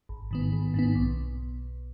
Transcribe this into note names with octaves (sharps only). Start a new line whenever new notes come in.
G#1
G#2 D#3 B3
G#1
G#2 D#3 B3
B1